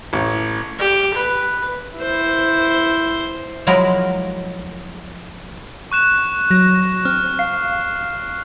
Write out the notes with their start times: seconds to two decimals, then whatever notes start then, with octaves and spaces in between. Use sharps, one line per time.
0.13 A1
0.79 G4
1.14 B4
1.97 E4 C5
3.67 F3 F#3 G#3 E4 F#4 A#4
5.92 C#6 F#6 E7
6.51 F#3 A#6
7.05 C4 F6
7.39 F5 C7